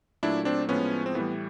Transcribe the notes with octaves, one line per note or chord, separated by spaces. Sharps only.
A#2 F#3 A3 D4 E4
C4 D4
A2 F3 G#3 B3 C#4
C4
A2 E3 G3 B3